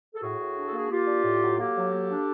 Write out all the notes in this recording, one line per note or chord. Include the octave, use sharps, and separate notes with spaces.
A4
A2 F#4 G#4
A2
D4
A4
A#3 G#4
A#3 F4 G4
D4
A2
F#3
A#3 G4 A4
F#3
A#3
D4